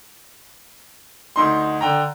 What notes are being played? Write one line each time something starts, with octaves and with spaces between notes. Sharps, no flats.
D2 D#4 C6
D3 G5 A#5